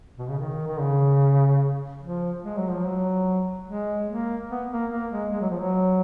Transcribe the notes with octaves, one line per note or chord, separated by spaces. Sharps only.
B2
C#3
D#3
D#3
C#3
F3
G#3
F#3
F3
F#3
G#3
A#3
B3
A#3
A#3
G#3
G#3
F#3
F3
F#3